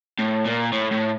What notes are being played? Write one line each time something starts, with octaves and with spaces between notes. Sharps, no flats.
A2
A#2
A2
A2